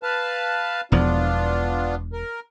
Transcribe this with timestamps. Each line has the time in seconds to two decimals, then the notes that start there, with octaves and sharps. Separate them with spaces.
0.03 B4 F5 A5
0.92 E1 E2 F3 B3 D4 F4
2.13 A#4